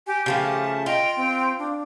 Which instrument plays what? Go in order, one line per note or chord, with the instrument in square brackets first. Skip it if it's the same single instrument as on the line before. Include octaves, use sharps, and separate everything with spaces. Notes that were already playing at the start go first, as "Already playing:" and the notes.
[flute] G4 [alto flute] G#5
[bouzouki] C#3 F3 A3 [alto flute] G4 [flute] A5
[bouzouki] F4 [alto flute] D#5 [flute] G5
[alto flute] C4
D4